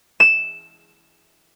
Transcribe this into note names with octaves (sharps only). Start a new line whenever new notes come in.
E7